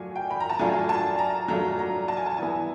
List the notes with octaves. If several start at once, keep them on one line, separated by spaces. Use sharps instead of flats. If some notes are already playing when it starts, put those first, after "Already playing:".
Already playing: F#3 A3 D4 F4 G#5
G5
B5
A#5
A5
F#3 A3 D4 F4 G#5
A5
A#5
F#3 A3 D4 F4 A#5
A#5
A5
G#5
A5
E3 G3 B3 E4 G#5